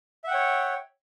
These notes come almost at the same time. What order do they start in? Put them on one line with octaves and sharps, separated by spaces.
E5 F#5 G5 C#5